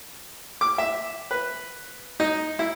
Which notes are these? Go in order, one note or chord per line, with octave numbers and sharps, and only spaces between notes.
D6
E5
B4
D#4
E4